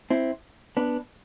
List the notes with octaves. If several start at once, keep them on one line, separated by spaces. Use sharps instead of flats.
C4 E4
B3 D4